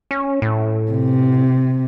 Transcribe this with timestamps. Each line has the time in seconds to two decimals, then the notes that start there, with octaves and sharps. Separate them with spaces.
0.11 C#4
0.42 A2
0.92 C3